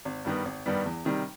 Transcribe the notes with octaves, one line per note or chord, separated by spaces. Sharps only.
G#1
G2 D#3 G3 B3
G#1
G2 D#3 G3 B3
E2
C3 D#3 G3